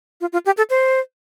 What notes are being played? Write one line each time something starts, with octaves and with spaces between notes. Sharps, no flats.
F4
F4
G4
A4
C5